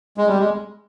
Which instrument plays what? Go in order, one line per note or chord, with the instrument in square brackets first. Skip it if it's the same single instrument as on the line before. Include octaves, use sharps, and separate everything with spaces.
[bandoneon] G#3
G3
G#3